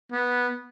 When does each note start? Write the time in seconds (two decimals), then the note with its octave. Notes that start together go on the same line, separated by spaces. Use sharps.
0.12 B3